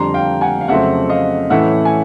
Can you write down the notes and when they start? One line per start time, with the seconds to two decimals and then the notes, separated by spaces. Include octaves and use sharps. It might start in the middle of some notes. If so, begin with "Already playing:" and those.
Already playing: F2 D3 G3 A#5 C6
0.14 F5 G5
0.41 F#5 G#5
0.61 F5
0.68 F2 C#3 F#3 A3 C4 E5 F#5
1.10 D#5 F5
1.50 A2 E3 A3 C#4 E5 F#5
1.85 G#5